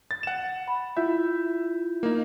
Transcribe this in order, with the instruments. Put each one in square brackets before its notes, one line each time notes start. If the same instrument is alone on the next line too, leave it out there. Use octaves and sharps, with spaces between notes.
[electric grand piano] A6
F#5 E7
[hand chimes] B5
[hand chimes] E4 F4 G6 [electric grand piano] E5
[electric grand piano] A#3 D#4